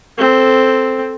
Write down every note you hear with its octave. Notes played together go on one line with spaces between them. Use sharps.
C4 A4